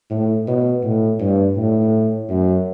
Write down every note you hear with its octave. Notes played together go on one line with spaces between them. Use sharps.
A2
B2
A2
G2
A2
F#2